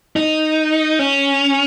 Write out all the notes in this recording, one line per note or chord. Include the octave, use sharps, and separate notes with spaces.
D#4
C#4